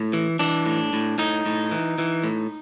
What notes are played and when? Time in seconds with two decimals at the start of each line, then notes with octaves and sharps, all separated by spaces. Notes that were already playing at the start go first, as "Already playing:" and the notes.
Already playing: A2
0.13 E3
0.39 E3 D4
0.66 A2
0.93 A2
1.18 A2 D#4
1.46 A2
1.71 E3
1.98 E3
2.24 A2